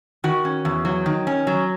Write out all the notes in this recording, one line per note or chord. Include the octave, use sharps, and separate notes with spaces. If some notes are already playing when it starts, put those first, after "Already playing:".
D#3 F#4
C#4
E2
F#3
D#3
C#4
F#3